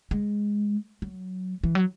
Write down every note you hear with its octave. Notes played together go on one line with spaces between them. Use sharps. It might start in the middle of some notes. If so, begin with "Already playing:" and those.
G#3
F#3
E3
F#3